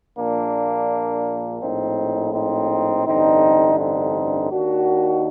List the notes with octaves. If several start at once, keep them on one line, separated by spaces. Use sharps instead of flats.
A#1 A#2 A#3 D4
A#1 A2 C4 D#4
C4 D#4
A1 G2 D3 C4 D#4
C4 D#4
D#2 D#3 D4 F#4